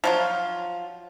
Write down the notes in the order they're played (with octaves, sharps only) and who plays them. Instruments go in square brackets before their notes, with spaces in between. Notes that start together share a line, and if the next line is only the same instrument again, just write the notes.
[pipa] F3 F#3 F4